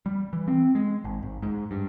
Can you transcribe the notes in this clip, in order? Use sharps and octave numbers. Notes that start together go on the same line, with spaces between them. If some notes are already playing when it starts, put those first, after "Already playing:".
G3
E3
C4
G#3
G#1
G#1
G#2
G2